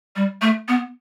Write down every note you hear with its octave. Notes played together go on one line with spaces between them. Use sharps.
G3
A3
B3